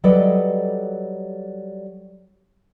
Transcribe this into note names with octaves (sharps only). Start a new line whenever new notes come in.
F#3 G3 A4 B4 D5 D#5